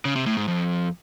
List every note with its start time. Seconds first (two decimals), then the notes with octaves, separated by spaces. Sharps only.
0.05 C#3
0.16 C3
0.26 A2
0.37 G#2
0.48 F2